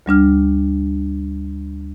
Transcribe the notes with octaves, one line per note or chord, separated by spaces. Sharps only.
D2 G3 D4 F6